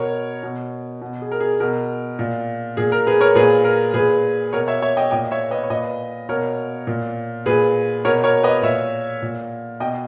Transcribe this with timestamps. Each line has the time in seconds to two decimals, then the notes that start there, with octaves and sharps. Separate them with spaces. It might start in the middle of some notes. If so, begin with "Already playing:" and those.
Already playing: B2 A#4 C#5
0.43 B2
1.01 B2
1.22 G#4
1.31 A#4
1.40 G#4
1.60 B2 A#4
2.19 A#2
2.77 A#2 G#4
2.92 A#4
3.07 G#4 B4
3.21 A#4 C#5
3.35 A#2 G#4 B4
3.64 A#4
3.94 A#2 G#4 B4
4.53 B2 A#4 C#5
4.68 C#5 E5
4.82 C#5 E5
4.97 D#5 G5
5.11 A#2 D#5 G5
5.31 C#5 E5
5.50 B4 D#5
5.64 C#5
5.70 A#2 B4 D#5
6.29 B2 A#4 C#5
6.87 A#2
7.46 A#2 G#4 B4
8.05 B2 A#4 C#5
8.24 A#4 C#5
8.43 B4 D#5
8.63 A#2 C#5 E5
9.22 A#2
9.80 B2 D#5 G5